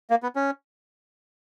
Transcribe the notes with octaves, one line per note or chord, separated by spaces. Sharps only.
A#3
B3
C#4